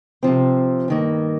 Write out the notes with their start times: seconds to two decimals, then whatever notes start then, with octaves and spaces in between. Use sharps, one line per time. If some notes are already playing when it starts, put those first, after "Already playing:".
0.23 C3 F3 C4
0.88 G2 D#3 A#3